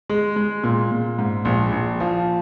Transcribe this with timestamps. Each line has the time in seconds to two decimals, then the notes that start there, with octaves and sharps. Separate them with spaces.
0.10 G#3
0.36 G#3
0.64 A#2
0.91 A#2
1.19 G#2
1.45 A#1
1.72 A#1
2.00 F3